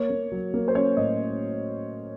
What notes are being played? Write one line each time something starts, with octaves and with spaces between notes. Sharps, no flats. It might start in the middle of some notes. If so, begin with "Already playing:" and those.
Already playing: A#3 C#5
A#3
F#3
A#3
C5
C#4 C#5
A2 D#5